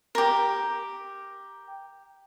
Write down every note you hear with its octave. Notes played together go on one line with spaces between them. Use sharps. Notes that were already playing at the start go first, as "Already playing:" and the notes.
G4 A#4